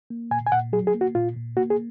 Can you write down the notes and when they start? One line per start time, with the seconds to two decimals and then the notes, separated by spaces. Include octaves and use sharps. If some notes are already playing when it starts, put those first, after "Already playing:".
0.10 A#3
0.31 A#2 G#5
0.47 G#5
0.52 A#2 F#5
0.73 F#3 G#4
0.87 G#4
0.95 A#3
1.01 F#4
1.15 A#2 F4
1.36 A#2
1.57 A#3 F#4
1.70 G#4